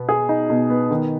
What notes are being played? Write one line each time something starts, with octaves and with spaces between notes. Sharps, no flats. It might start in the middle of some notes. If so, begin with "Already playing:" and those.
Already playing: B2 B3
G#4
D#4
B2
B3
D#3